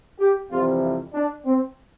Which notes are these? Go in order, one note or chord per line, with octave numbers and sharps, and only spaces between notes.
G4
F2 C3 E3 G3 F4
F4
D4
C4